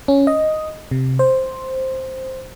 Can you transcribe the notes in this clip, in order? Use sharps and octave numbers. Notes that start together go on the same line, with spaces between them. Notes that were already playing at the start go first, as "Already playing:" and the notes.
C#4
D#5
C3
C5